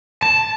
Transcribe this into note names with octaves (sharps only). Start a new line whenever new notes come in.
A5